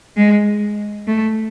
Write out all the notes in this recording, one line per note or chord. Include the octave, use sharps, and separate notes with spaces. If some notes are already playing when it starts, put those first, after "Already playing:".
G#3
A3